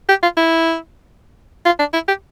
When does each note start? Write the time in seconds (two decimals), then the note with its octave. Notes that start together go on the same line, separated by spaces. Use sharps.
0.09 G4
0.23 F4
0.37 E4
1.65 F4
1.79 D4
1.93 E4
2.08 G4